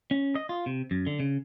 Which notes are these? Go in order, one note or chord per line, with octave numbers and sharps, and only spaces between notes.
C#4
D#5
F4
C3
F#2
D3
C#3